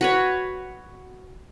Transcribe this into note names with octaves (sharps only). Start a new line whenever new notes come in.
F#4 B4 C#5